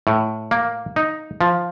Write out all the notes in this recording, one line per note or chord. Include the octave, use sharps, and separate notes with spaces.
A2
A#3
D#4
F3